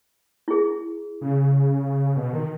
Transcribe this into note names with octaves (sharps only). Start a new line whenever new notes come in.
E4 G#4
C#3
B2
D#3